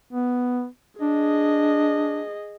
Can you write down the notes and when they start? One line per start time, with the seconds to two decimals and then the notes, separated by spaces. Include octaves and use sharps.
0.13 B3
1.01 D4 G#4 D#5